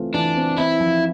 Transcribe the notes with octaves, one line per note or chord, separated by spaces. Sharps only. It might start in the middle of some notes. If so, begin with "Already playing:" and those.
Already playing: E3 A3 C4 F4
E3 D4
C4
C4 E4
F3